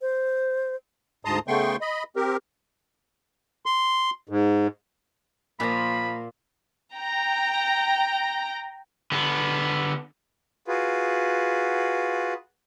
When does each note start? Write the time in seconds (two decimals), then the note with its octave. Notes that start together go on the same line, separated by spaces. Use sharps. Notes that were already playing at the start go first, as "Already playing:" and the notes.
0.01 C5
1.25 D2 G#2 A5 A#5 C6 D#6
1.48 C#3 A3 B3 G5 C6 C#6
1.81 D#5 B5
2.16 C4 G4 A#4
3.66 C6
4.29 G#2
5.60 A#2 F3 A#3 A#5 B5
6.95 G5 A#5
9.12 D3 B3
10.68 F4 F#4 G#4 B4